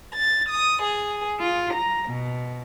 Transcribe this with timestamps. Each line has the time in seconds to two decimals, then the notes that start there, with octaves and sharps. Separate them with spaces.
0.13 A6
0.48 D#6
0.82 G#4
1.38 F4
1.73 A#5
2.08 B2